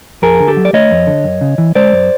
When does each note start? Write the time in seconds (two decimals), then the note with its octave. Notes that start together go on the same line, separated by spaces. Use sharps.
0.22 F2 G#4 A#4
0.40 D3
0.48 G4 A4
0.57 F#3
0.65 D5
0.73 A3 C#5 D#5
0.91 F2
1.07 D3
1.24 F#2
1.41 C#3
1.58 E3
1.75 G#3 C5 D5
1.92 F#2